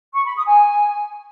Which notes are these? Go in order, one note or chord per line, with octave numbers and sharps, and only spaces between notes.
C#6
B5
D#6
G#5